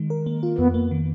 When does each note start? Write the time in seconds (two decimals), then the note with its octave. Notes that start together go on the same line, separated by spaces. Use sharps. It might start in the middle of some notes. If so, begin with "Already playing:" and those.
Already playing: D#3 G#3
0.10 A#4
0.26 A#3
0.43 F4
0.58 F2 B3
0.74 A#3
0.91 D#3